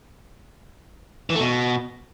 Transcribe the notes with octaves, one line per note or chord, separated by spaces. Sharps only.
E3
A3
B2